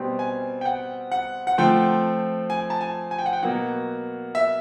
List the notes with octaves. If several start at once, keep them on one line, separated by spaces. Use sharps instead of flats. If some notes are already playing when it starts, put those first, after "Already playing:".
Already playing: B2 G3 C4
G#5
G5
F#5
F#5
F#5
F3 A3 C4 G5
G#5
A5
G#5
G#5
G5
F#5
G5
B2 F#3 A#3 F#5
E5